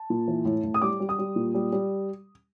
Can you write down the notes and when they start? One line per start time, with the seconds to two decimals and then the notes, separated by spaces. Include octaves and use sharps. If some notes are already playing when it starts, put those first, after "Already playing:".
Already playing: A5
0.10 A#2
0.28 E3
0.45 A2
0.64 A2
0.74 D#6
0.82 G3 D6
1.00 G3
1.09 D#6
1.19 G3
1.36 A#2
1.54 G3
1.72 G3